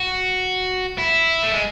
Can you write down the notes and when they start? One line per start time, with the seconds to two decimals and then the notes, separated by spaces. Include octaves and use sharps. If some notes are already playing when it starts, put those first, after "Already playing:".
Already playing: F#4
0.98 E4
1.43 A3
1.53 G#3